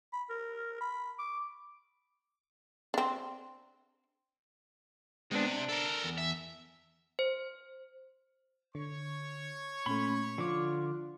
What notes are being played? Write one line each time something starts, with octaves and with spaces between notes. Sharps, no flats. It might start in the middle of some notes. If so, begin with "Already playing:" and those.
B5
A#4
B5
D6
C4 D4
C3 G#3 B3 D4
D4
A4 A#4
E2
E5
C5
D3 C#5 C#6
A#2 A3 C#4 B5 C6
D3 F3 F4 D6